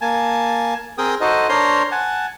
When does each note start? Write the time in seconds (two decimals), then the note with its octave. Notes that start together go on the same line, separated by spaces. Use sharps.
0.01 A#3 G#5 A5
0.98 C4 G#4 A#4 G5 D#6
1.21 D#4 F#4 A4 C5 D#5
1.49 D4 A#4 C5 C#5 A#5 C6
1.91 F#5 G#5 A5